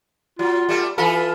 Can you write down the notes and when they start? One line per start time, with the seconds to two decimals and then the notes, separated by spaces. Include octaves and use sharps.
0.39 F#3 F4
0.69 G3 A3
0.98 E3 F4 A4 B5